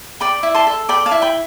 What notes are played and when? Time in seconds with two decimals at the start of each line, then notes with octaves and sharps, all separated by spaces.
0.20 D5 G5 B5
0.43 E4
0.54 A5 C6
0.67 A4
0.89 D5 G5 B5
1.06 F5 A5
1.11 E4
1.22 G5 B5